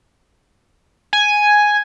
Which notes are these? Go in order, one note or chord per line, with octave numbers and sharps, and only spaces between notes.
G#5